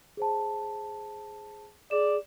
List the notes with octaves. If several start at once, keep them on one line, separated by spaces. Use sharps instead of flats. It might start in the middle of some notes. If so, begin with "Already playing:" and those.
G#4 C5 A5
G#4 D5 E7